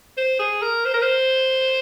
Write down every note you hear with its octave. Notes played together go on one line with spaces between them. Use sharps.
C5
G#4
A#4
C5
A#4
C5